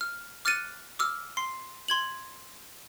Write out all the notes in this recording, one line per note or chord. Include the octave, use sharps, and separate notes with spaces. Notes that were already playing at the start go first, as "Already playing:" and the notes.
F6
D6 F6 F#6 A6 C#7 D#7
D6 E6 F6
C6 C7
C6 G#6 F#7